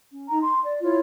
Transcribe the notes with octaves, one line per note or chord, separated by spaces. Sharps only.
C#4
D#4 A#5
C6
D5
E4 F4 C#5